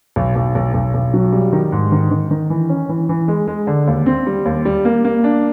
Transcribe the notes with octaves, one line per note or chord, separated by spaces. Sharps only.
B1
B1
B1
B1
B1
F#3
G3
D#3
G#2
D#3
D#3
D#3
E3
C#4
E3
E3
G#3
G#3
D3
D#2
C4
G3
D#2
G3
A#3
A#3
D4